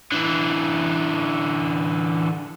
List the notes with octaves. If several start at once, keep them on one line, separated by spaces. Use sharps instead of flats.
D3 E3